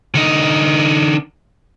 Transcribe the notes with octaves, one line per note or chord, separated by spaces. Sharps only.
D3 D#4